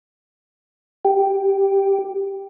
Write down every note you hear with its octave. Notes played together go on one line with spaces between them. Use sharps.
G4